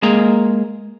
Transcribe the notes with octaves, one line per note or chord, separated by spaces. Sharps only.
G#3 A#3 G#4 A#5